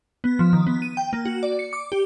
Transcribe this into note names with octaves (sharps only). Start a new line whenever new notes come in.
B3
F3
D#3
B3
D#7
G5
A#3
F#4
D5
C#7
D6
G4